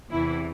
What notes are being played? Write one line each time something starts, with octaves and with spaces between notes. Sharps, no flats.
E2 C3 E3 E4